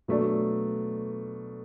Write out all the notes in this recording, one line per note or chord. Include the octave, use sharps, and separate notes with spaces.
B2 F#3 A3 D4